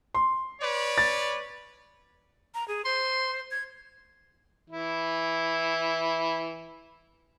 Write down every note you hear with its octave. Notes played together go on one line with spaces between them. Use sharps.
C6
B4 C#5 D5
A6
A#5
G#4
C5 C6
G#6
E3 E4